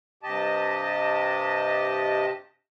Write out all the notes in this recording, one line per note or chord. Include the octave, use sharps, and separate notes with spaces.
G2 C3 G4 D#5 A5